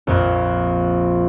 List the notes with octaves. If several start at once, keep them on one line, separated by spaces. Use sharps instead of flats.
A#1 F2